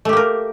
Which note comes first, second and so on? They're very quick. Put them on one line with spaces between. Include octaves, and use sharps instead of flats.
A3 G4 A#3 A#4